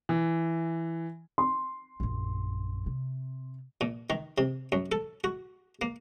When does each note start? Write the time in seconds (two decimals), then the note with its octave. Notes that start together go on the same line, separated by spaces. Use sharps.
0.09 E3
1.38 C6
2.00 A#1 F#2
2.86 C3
3.81 A#2
4.10 D#3
4.38 C3
4.72 F#2
4.92 A4
5.24 F#4
5.82 A#3